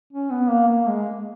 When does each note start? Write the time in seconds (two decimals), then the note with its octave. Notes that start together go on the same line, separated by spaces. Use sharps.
0.13 C#4
0.31 B3
0.50 A#3
0.68 A#3
0.88 G#3